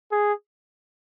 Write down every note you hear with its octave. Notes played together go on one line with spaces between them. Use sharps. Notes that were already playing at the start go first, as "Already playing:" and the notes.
G#4